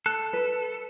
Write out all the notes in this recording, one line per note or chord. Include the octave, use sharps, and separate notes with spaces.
A4 F#6
B4